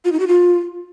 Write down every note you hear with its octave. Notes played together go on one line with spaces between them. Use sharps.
F4
D#4
F#4
F4